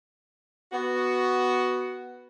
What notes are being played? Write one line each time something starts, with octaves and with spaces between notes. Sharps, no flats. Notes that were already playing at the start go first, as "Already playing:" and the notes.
B3 F#4